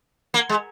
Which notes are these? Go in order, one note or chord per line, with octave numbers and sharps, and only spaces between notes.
A#3
G#3